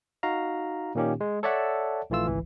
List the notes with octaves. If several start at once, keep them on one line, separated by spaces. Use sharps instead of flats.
D#4 F#4 F5 A#5
A#2 D#3 A#3 C#4 D#4 G4
G#3
A4 C#5 D5 E5 F#5 A5
A#1 E3 A3 F4 E6
G#1 C#2 E3